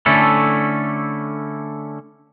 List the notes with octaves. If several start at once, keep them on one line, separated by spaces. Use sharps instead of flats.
D3 A3 C#4 E4 A4